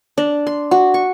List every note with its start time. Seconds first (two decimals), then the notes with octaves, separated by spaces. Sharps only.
0.18 D4
0.47 C6
0.71 F#4
0.94 C#6